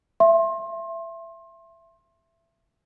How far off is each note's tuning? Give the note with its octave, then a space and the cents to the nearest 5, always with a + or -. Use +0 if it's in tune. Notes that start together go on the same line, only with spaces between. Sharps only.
E5 +20 C6 +30